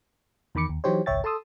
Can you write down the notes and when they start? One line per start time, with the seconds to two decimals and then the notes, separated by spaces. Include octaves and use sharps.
0.55 E2 D#3 B5 D6 C#7
0.69 D#2
0.84 E3 F#3 D#4 G4 C5 C#5
1.06 G#1 C#2 C#5 E5 G5 A6
1.24 A4 A5 C6 D#6 E6